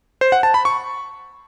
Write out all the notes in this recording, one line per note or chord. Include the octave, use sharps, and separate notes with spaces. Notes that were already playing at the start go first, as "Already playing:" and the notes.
C5
F#5
A5
B5
C#6